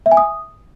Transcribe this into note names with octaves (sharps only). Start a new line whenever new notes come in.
E5
G#5
D#6